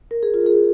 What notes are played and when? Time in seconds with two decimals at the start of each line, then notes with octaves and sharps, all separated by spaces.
0.11 A#4
0.23 G#4
0.34 F4
0.46 G#4